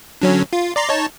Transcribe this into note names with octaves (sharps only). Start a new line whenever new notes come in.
D3 F#3 C#4
F4
D5 A#5 C6
D#4 C#5 A5